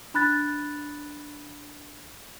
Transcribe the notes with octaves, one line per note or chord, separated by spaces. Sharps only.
D4 B5 F#6 A6